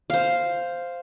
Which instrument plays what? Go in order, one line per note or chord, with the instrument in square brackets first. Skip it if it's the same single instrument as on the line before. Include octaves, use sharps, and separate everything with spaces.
[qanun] C5 F5